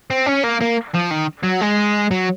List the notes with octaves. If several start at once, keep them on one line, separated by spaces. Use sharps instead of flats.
C4
C#4
A#3
A#3
F3
D#3
F#3
G#3
F#3